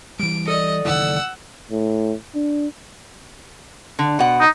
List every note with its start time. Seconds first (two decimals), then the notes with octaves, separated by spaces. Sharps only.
0.19 E3 G3 D7
0.48 A4 D5 D#5
0.85 F#1 D#3 E3 F#5 E6
1.71 A2
2.35 D4
3.99 D3
4.19 B2 F#5
4.40 D#4